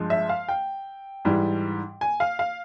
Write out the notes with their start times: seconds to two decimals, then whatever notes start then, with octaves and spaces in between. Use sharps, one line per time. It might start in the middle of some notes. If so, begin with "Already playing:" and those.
Already playing: G2 F3 G#3
0.10 E5
0.29 F5
0.48 G5
1.25 G#2 E3 G3
2.01 G#5
2.20 F5
2.39 F5